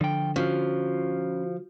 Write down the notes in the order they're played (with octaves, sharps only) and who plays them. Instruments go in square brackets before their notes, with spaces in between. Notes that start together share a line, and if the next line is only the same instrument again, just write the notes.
[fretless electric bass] D3 [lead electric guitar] F3 G5
[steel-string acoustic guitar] F3 [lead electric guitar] C#4 F4 [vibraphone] F#4